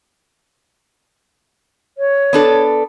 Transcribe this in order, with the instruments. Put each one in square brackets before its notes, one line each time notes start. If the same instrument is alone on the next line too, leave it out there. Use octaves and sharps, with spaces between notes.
[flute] C#5
[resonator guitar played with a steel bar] B3 D4 A4